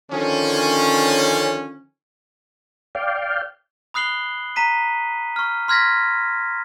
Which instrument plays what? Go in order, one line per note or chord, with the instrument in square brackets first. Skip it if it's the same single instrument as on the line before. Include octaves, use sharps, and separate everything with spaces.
[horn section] D3 D#3 F3 C#4
[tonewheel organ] D5 F5 G5
[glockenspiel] B5 D#6 F#6 C7 F#7 G7
A#5 B6 D#7
C#6 F6
C6 F6 G#6 A#6 B6